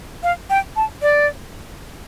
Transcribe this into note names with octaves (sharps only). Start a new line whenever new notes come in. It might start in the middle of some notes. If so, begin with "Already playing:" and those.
F5
G5
A5
D5